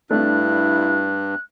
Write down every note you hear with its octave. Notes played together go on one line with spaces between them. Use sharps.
G2 A3 D4 E4 F#6